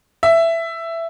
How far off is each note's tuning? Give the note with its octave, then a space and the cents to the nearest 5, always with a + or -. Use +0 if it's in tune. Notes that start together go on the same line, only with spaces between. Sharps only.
E5 +10